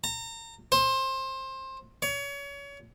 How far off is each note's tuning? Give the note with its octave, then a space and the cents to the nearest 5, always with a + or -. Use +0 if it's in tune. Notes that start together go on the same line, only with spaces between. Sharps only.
A#5 -35
C5 +20
C#5 +30